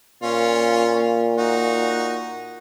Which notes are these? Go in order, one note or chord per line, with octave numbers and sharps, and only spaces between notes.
A#2 C#4 F4
D#4 F#4